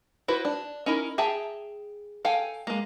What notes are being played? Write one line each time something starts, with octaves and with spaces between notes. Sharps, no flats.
E4 F#4 B4 C5
D4
C#4 D#4 E4 A#4
G#4 E5 G5 A5 A#5
A4 F5 G5 G#5
G#3 A#3